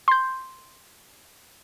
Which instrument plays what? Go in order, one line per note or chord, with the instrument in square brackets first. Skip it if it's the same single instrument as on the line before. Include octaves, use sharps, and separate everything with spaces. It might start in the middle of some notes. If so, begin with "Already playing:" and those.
[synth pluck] C6 G6